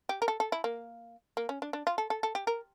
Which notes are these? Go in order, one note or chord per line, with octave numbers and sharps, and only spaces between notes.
G4
A#4
A4
A4
E4
A#3
A#3
C#4
D4
D4
F4
A4
A4
A4
G4
A#4